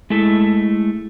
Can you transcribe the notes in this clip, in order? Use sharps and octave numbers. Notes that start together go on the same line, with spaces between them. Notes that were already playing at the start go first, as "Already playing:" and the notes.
G#3 A3 E4 A4